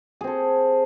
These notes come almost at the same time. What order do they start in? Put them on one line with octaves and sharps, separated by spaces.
G#4 C4 A4